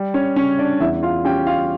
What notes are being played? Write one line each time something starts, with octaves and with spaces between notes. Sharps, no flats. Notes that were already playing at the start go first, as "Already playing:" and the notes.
Already playing: G3
C#4 C#5
C#3 C#4 C#5
D4 D5
E2 E4 E5
F4 F5
C#4 G4 G5
F4 F5